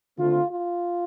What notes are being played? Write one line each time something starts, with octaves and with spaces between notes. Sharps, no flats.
D3 A3 C4 F4
F4